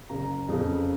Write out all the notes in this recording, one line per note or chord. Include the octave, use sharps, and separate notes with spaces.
F#1 A#5
F2 C#3 F3